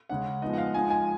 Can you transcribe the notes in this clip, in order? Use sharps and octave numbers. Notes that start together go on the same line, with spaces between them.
C#3 G#3 C#4 F#5
F3 G#3 B3 D#4 D#5
F#5
F5
F3 G#3 D#4 G#5
G#5